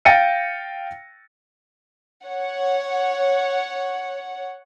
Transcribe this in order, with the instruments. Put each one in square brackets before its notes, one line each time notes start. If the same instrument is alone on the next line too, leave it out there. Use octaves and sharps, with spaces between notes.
[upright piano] F5 G5 A6 A#6 C#7 D#7
[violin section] C#5 F#5